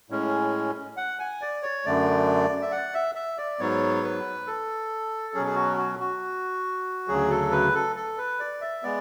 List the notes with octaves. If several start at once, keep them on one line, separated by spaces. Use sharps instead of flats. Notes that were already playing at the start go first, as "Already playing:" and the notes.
A2 G#3 C#4
F#5
G#5
D5
C#5
F#2 D3 A3 D5
E5
F#5
E5
E5
D5
G#2 F#3 B3 C#5
B4
A4
B2 F#3 C#4 G#4
G#4
F#4
F#4
F#4
D2 C#3 F#3 G#4
A4
B4
A4
A4
B4
D5
E5
G#3 B3 D5